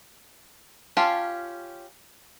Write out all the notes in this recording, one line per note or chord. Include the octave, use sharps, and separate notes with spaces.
C#4 F4 G4 F5 A5